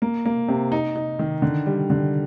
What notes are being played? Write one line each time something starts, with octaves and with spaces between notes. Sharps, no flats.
A#3
A#3
C3
D#4
D#4
D#3
D3
G3
D3